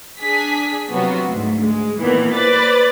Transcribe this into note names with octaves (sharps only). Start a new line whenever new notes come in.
D4 G#4 B6
C3 F#3 B3 F4 F#4
D2 G#2
G#3
A#2 D#3 E3 B3
B4 C5 D5 A6